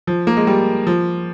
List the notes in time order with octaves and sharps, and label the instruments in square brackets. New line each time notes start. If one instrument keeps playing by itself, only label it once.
[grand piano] F3
A#3
G#3
G3
F3